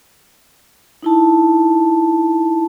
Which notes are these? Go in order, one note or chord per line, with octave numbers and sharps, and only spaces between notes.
D#4 E4 A5